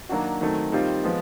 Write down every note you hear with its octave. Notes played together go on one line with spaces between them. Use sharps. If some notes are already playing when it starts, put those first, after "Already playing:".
D#3 F#3 A#3 D4 F#4
D#3 F#3 A3 C4
D#3 G3 C4 F4
F3 G#3 B3